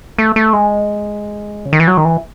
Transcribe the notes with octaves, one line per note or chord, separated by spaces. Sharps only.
A3
A3
G#3
C#3
D#3
E3
F#3
D#3
E3